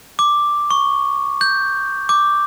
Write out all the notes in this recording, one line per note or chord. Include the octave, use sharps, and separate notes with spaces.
D6
C#6
G6
D6